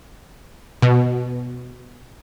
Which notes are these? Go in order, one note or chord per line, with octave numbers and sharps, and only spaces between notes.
B2